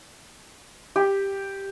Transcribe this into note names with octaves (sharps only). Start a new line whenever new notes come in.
G4